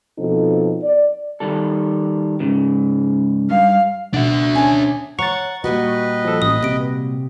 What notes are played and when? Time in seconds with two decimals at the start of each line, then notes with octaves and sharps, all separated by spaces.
0.18 B2 F3 C4 D#4 A4
0.82 D5
1.40 D#3 G3 A4
2.40 G#2 C#3
3.50 G2 F5
4.14 B2 D4 E5 F#5
4.55 C#4 G#5 A5
5.19 C#5 F#5 A#5 C#6 A6
5.64 A#2 G3 F#4 B4 D#5
6.25 F3 A4
6.42 A1 D#6
6.63 C3 A#6 D7